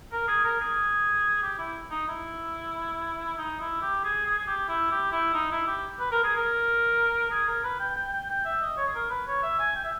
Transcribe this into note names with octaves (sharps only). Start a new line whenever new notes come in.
A#4
G#4
A#4
G#4
G4
E4
D#4
E4
D#4
E4
G4
G#4
G#4
G#4
G4
E4
G4
E4
D#4
E4
G4
B4
A#4
G#4
A#4
G#4
A#4
B4
G5
G5
G5
G5
E5
D#5
C#5
G#4
A#4
B4
C#5
E5
G#5
G5
E5